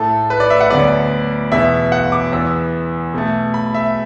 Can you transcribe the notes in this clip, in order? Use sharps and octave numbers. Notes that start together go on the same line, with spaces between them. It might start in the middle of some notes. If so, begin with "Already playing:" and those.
Already playing: A2 A3 A4
B4
D5
E5
F#5
D2 D3 F#3 B3 D5
E2 B2 B3 E5
F#5
D6
E2 E3 B3 E6
B2 A3
B5
E5